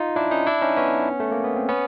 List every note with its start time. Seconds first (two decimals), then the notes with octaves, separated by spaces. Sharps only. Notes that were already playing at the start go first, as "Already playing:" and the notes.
Already playing: D#4 F4
0.16 D4 E4
0.31 C#4 D#4
0.47 D4 E4
0.61 C#4 D#4
0.77 B3 C#4
1.20 A3
1.32 A#3
1.44 B3
1.56 C4
1.69 B3 C#4